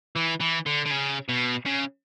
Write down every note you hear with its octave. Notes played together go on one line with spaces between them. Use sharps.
E3
E3
D3
D3
C#3
B2
C#3